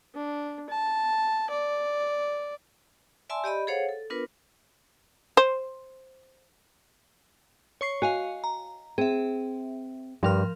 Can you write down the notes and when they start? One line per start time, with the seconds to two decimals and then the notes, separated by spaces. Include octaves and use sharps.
0.15 D4
0.70 A5
1.50 D5
3.30 D5 E5 G#5 A5 C6 E6
3.44 G4 D5 D#5 B5
3.67 G#4 A4 C5 C#5 F5 F#5
3.89 A4
4.10 B3 D4 F4 A#4 B4
5.37 C5
7.81 C#5 C#6 C7
8.02 F#4 D#5 F5 G#5
8.44 A#5
8.98 C4 G#4 E5
10.23 G2 F3 G4 A#4 F6